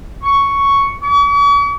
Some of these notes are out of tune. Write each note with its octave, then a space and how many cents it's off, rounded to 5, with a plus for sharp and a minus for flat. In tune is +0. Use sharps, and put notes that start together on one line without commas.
C#6 +5
C#6 +45